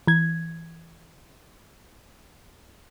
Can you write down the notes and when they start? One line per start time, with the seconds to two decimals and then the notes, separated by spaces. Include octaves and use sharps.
0.07 E3 G#6